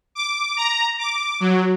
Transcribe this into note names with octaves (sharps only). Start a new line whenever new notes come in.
D6
A#5
D6
F#3